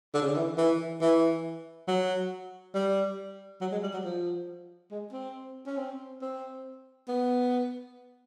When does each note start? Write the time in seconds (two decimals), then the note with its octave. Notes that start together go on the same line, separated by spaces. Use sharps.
0.14 D3
0.22 C#3
0.29 D3
0.36 E3
0.58 E3
1.01 E3
1.88 F#3
2.74 G3
3.61 F#3
3.72 G#3
3.83 G3
3.93 F#3
4.04 F3
4.91 G#3
5.12 C4
5.66 C#4
5.77 C4
6.21 C4
7.08 B3